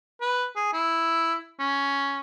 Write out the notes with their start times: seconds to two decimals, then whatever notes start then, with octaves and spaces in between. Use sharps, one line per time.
0.21 B4
0.56 G#4
0.73 E4
1.60 C#4